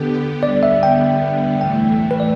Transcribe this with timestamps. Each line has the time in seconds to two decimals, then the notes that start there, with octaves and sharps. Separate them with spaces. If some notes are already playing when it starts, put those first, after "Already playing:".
Already playing: D3 B3 G4 A4
0.43 D3 G3 B3 D5
0.63 E5
0.83 G5
1.60 A2 E3 A3 G5
2.11 B4
2.20 D5